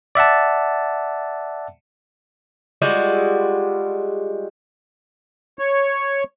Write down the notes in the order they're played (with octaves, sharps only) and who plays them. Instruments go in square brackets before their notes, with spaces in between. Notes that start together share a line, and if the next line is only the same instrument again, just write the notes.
[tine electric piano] D5 E5 F#5 A5
[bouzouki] G3 G#3 F4 F#4
[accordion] C#5